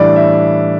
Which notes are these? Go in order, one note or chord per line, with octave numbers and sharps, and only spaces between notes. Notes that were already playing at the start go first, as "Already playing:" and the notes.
Already playing: A2 E3 G3 D4 D5
E5